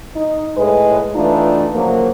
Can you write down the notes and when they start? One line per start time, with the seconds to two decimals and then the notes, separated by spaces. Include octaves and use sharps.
0.16 D#4
0.57 A2 G#3 B4
1.15 E3 A3 B3 D4 D#4 F4
1.75 C#3 F3 F#3 A#3